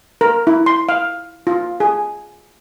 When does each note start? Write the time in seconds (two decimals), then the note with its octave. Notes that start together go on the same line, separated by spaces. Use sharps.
0.21 A#4
0.47 E4
0.66 C6
0.89 F5
1.47 F4
1.80 G#4